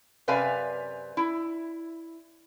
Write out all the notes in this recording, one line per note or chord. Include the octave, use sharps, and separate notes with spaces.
F#2 C3 B4 D5 F5 G#5
E4